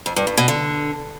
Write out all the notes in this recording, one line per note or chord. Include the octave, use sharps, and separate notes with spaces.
F2
G2
G2
B2
D3